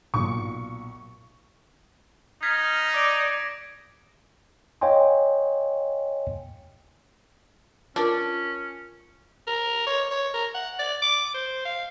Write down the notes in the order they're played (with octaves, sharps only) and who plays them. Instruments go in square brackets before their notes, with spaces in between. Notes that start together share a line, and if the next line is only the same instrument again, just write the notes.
[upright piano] B1 A#2 [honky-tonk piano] C#6
[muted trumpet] D#4 [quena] F6 [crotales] G#6 A#6 B6
[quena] D5 [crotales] D6 A#6 D7
[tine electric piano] C#5 D#5 F5 G5 G#5 C6
[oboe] C#4 [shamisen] D4 [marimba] F4 A#4
[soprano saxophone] A#4
C#5
C#5
A#4
F#5
D5
D6
C5
F5